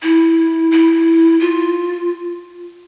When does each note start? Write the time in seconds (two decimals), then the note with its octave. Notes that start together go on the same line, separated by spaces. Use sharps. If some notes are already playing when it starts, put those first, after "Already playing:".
0.03 E4
0.71 E4
1.40 F4